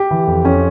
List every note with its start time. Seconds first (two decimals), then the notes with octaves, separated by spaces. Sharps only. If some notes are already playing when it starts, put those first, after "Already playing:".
Already playing: G4
0.11 E3
0.27 F2
0.44 F2 C#4